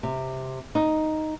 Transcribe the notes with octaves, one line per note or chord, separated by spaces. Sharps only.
C3
D#4